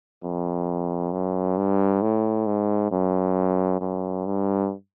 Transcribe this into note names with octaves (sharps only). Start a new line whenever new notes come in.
F2
F#2
G2
A2
G#2
F#2
F#2
G2